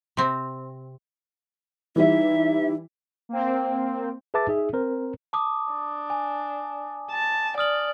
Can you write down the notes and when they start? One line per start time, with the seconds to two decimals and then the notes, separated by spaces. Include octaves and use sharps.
0.17 C3 C4
1.96 E3 G3 D#4 E4 E5
3.29 A#3 C4
4.34 G#4 B4 E5 A5 D6 A6
4.48 D#4 G#4 E5
4.73 C4 A#4 C5
5.33 A5 D6 D#6
5.72 D4
6.10 G#5
7.11 A5
7.58 D5 D#6 F6 F#7